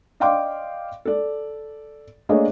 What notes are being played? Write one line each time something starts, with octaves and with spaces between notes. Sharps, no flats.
D5 D#5 F5 G5 C6 D6
A4 D5
A3 A#3 D4 G#4 C#5 D#5